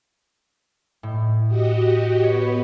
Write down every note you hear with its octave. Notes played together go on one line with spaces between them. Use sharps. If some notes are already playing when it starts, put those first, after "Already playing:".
A2
F#4 G4 D#5
B3 B4 C#5